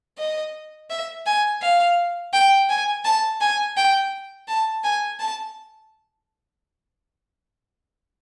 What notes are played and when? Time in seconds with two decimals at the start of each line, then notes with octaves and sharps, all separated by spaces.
0.18 D#5
0.90 E5
1.26 G#5
1.62 F5
2.33 G5
2.69 G#5
3.05 A5
3.41 G#5
3.77 G5
4.48 A5
4.84 G#5
5.19 A5